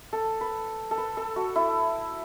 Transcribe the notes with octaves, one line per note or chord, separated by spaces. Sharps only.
A4
B4
A4
B4
A4
F#4
E4